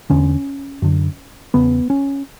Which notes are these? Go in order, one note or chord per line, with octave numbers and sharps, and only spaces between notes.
E2 D3 C#4
F#2 D3
E2 C#3 B3
C#4